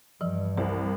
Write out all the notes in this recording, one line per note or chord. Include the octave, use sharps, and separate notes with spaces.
G2 E3 F3
C2 C5